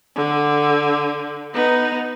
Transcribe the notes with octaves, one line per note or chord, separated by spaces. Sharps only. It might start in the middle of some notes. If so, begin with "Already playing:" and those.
D3
B3 D#4